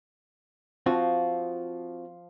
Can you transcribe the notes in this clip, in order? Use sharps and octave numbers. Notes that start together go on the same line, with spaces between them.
F3 C4 F4 F#4